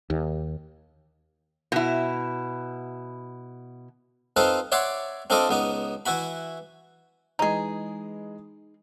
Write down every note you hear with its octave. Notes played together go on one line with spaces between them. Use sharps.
D#2
B2 E4
C4 D#4 F4 A4 B4 C5
C#5 D5 E5 F#5 C6 D6
C4 D4 F4 A4 D5 D#5
C#2 B3 D#4
E3 E4 F#4 B5
E3 G#3 D#4 G#4 D#5